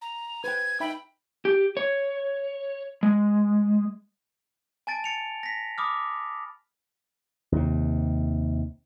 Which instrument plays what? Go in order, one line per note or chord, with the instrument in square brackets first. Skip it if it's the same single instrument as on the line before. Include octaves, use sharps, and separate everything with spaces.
[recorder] A#5
[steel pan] B4 C5 G5 [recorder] G#6
[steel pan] D#4 E5 B5 [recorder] G5
[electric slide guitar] G4
C#5
G#3
[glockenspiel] G#5 A5 A6 D7
A6 C#7 F7
A#6 B6
B5 D6 D#6 F6
[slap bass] D#2 C3